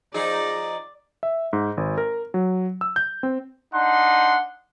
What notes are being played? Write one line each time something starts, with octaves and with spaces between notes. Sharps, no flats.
F3 D#4 G#4 D5
E5
G#2
G#1
A#4
F#3
E6
G6
C4
D4 D#4 F#5 C6